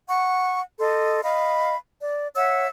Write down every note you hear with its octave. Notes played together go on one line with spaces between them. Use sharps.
F#5 C#6
A4 D#5 C6
D#5 F5 B5
D5
C#5 E5 F#5 E6